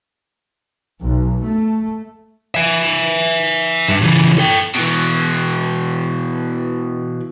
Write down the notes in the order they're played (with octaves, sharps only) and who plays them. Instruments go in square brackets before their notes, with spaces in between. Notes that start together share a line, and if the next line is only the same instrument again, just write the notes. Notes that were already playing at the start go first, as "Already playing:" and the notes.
[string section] B1
A3
[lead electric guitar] E5 G#5
G2
C#3 E3
A4 G5
[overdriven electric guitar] B2 E3